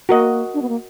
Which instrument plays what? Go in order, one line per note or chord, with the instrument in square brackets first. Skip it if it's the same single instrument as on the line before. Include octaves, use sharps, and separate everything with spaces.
[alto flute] A#3 [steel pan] F#4 A#4 D#5
[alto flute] D4
B3
A#3